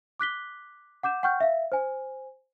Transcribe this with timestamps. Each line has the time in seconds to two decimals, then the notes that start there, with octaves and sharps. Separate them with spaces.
0.19 D6 F#6 B6 G7
1.03 F#5 D6 G6 E7
1.23 F#5 G5 C#6 F6 G6
1.40 E5 F5
1.72 C5 G#5